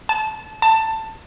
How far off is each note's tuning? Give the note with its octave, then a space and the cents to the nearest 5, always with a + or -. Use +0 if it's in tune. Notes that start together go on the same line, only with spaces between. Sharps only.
A5 -25
A5 +15